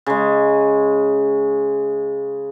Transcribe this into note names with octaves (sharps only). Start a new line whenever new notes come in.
C#3 G#3